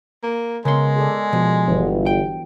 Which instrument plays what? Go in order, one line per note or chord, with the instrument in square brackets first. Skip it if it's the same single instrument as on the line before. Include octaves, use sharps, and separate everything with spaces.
[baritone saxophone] A#3
[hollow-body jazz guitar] C#3 C6 [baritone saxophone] G#3 [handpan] B3 A#4
[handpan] G#4 A4 D5
[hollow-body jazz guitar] B2 F3
[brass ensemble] G1 [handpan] E3 F#3 B3
[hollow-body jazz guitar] G5